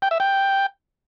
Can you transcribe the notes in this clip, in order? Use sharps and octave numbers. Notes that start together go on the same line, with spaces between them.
G5
E5
G5